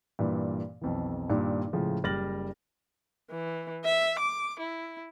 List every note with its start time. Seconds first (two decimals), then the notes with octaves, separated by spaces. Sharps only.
0.19 G2 A#2 E3
0.81 B1 F2 E3
1.30 G2 A#2 D#3
1.73 A2 C#3 F3 G#3
2.04 F#1 G3 F6 A6 A#6 F#7
3.31 E3
3.84 E5
4.19 D6
4.59 E4